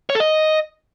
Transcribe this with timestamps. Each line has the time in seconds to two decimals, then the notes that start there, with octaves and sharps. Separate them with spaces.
0.10 C#5
0.15 A4
0.20 D#5